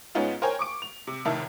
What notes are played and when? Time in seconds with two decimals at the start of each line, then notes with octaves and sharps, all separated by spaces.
0.15 G#2 B3 C#4 D#4 F4
0.42 A#4 C5 C#5 G5 G#5
0.59 C#6 D6 D7
0.82 F7
1.07 C3
1.25 F1 A2 D#3 E5 A5